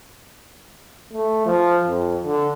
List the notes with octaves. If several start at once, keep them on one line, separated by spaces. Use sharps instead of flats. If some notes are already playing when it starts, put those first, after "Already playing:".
A3
F3
F2
D3